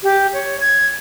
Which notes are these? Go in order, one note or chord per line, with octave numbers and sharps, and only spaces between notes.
G4
C#5
G#6